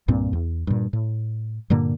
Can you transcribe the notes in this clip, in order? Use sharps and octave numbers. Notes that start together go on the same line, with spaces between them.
C2 G2 A#2 C4
E2
G2 A#2
A2
G2 A#2 D3 A#3